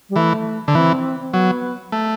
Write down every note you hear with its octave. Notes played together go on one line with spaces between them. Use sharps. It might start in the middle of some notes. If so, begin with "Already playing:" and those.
G3
E3 A3
D3
E3 C4
C4
F#3 B3
A3